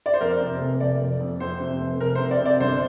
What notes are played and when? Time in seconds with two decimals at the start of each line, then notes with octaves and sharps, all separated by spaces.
0.06 D5
0.14 C5
0.21 F2 A#4
0.41 C3
0.61 F1
0.80 F1 D5
1.00 F2
1.20 F2
1.40 F2 C5
1.60 C3
1.80 F1
2.00 F1 A#4
2.15 C5
2.20 C3
2.31 D5
2.40 C3
2.45 D5
2.60 G1 C5